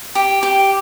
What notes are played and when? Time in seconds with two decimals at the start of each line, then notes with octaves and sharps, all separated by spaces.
0.15 G4
0.43 G4